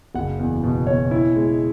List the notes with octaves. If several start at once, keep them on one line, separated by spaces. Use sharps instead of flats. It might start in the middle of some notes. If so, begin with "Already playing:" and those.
F#1 F#5
E2
B2
B2 C#5
E4
G#3